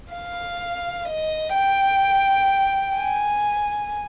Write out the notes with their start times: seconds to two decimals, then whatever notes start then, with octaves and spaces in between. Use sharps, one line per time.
0.14 F5
1.08 D#5
1.54 G5
2.97 G#5